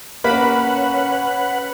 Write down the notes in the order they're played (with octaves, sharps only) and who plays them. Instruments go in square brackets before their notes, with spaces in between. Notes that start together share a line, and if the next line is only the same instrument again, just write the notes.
[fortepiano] A#3 [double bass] C#4 [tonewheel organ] B4 F#5 [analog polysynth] B5